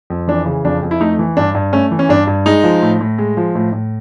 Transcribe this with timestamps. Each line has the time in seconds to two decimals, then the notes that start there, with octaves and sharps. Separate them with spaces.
0.10 F2
0.28 E3 D4
0.46 C#3
0.64 F2 D4
0.82 F2
0.91 E4
1.00 A3 D#4
1.19 E3
1.37 G2 D4
1.55 G2
1.73 A3 C#4
1.91 E3
1.99 C#4
2.09 G2 D4
2.27 G2
2.46 G#3 D#4
2.64 F3
2.82 A2
3.00 A2
3.18 G#3
3.37 F3
3.55 A2
3.73 A2